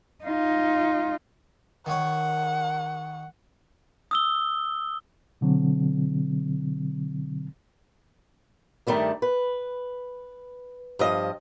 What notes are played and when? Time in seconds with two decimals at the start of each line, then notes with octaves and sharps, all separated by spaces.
0.25 D#4 F4
1.86 D#3 C#5 F#5
4.11 D#6 E6 G7
5.41 B2 D3 F#3 C4
8.87 G2 D#3 G3 A3 D4
9.22 B4
10.99 G2 F3 D#5